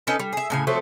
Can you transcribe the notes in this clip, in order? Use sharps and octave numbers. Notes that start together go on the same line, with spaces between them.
C#4 D#4 A4 B4
G3
G#4 E5
A2 C#3 G#5
F3 F#3 A3 C4